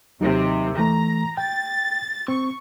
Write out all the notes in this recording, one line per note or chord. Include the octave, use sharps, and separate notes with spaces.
D#2 C3 F#3 D#4
E3 A3 A#5
G5 A6
C4 C#6